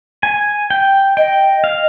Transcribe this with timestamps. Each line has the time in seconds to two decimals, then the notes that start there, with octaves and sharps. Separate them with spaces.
0.23 G#5
0.70 G5
1.17 D#5 G5
1.64 F5